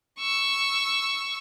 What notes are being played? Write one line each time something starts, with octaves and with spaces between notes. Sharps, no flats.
C#6 E6